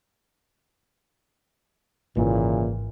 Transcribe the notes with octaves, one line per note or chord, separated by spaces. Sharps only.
G#1 A#2 C#3 E3 A#3